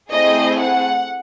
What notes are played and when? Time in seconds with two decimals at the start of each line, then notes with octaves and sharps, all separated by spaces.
0.11 A3 C4 E4 G#4 D#5
0.60 F#5